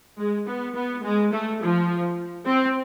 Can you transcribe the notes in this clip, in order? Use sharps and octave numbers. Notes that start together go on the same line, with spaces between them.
G#3
B3
B3
G#3
A3
F3
C4